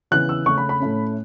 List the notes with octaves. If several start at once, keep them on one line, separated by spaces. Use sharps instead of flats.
C#3 E3 B3 F#6
E6
C#3 A3 C#4 C#6
B5
B5
A2 A3 C#4